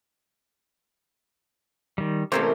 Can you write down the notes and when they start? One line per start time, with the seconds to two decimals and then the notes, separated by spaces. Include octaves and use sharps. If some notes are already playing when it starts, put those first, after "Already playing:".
1.98 D#3 G3
2.32 A1 C3 E3 A3 A#3 C5 C#5